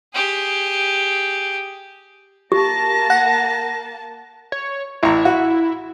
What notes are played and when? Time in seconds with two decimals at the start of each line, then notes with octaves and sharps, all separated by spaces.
0.14 G4 G#4
2.52 A#3 G4 A5 A#6
3.10 F#5
4.52 C#5
5.03 A1 E4 A#5
5.25 F#4